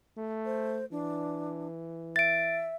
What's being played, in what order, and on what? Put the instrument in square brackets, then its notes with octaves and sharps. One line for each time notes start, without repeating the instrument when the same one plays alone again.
[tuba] A3
[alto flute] C5
[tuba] E3 [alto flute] D4
[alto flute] E5 [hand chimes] A6 D7